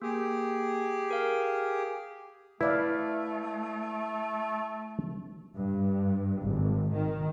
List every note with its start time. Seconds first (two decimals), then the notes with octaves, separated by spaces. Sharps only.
0.02 A#3 G4 G#4
1.11 A#4 F5
2.61 A3 E4 B4 D5 F5
5.56 G2
6.42 G#1
6.92 D#3